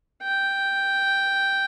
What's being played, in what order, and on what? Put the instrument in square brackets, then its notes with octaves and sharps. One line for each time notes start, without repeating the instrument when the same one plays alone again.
[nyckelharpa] G5